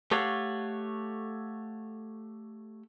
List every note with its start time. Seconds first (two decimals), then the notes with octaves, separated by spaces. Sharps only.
0.11 A3 G4 A4 C#5 F5 F#5